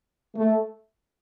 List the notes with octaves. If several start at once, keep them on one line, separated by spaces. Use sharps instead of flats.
A3